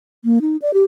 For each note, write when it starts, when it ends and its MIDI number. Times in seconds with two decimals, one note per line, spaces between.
0.25 0.39 58
0.42 0.57 63
0.62 0.74 74
0.74 0.84 67